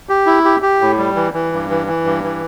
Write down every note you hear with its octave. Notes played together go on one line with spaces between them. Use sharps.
G4
E4
G4
G4
A2
G3
E3
E3
G2
E3
E3
G2
E3